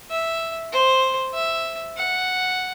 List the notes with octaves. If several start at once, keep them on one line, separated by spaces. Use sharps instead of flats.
E5
C5
E5
F#5